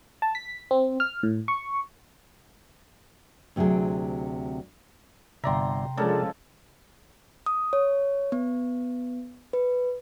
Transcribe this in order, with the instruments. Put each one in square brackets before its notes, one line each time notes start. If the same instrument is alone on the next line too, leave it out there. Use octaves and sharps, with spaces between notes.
[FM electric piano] A5
B6
C4
F6
A2
C#6
[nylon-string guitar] D2 C3 F#3 C4 G#4
[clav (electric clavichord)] G1 D5 E5 [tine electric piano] C3 G5 [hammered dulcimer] A#5 C6
[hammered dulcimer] C#3 A4 A5 [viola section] F3 G#3 [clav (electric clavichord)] D4 A#4 D5
[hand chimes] D#6
C#5
B3
B4